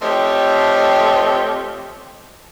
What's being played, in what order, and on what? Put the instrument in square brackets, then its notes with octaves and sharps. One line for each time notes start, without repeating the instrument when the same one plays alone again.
[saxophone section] F3 A3 C4 G4 C#5 D#5